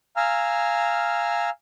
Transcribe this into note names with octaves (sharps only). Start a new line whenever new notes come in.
F5 G#5 A#5 E6 F6